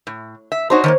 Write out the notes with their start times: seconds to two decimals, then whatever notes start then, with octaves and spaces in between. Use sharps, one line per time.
0.07 A2
0.52 E5
0.70 D4 D#4 F#4 C5 C#5
0.84 D#3 A3 A#3